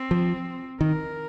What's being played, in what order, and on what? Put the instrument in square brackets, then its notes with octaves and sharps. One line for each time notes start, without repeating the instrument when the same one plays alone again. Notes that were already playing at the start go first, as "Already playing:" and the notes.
Already playing: [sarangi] C4
[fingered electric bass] F3
[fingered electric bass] D#3 [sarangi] A#4